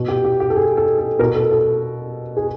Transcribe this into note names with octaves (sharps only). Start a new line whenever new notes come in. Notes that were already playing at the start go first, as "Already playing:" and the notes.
Already playing: B2
G4
G4
G4
A4
G#4
A4
A4
B2 A#4
A4
A4
G#4